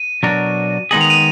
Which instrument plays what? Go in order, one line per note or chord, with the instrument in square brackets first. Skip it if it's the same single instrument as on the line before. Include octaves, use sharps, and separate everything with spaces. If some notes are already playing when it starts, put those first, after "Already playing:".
Already playing: [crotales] D#7
[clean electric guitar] B2 F#3 D4 F#4 A#4
[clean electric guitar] D#3 G#3 B3 D#4 G#4 [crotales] F#7
[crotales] F7
D#7